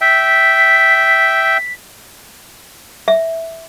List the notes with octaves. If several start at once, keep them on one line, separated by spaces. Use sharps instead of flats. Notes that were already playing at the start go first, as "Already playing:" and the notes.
E5 G5 B6
E5